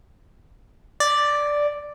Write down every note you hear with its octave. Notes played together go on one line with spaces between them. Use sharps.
D5